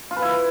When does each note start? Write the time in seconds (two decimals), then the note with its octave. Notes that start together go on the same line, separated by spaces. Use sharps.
0.11 F4
0.16 B4
0.22 E4